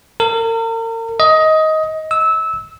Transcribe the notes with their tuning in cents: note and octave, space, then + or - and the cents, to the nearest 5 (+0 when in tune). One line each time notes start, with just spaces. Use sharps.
A#4 -40
D#5 +15
E6 -20